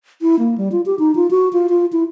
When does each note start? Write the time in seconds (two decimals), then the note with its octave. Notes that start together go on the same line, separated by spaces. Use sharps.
0.22 E4
0.39 A#3
0.58 G3
0.72 F4
0.86 G4
0.99 D#4
1.15 F4
1.31 F#4
1.53 F4
1.69 F4
1.92 E4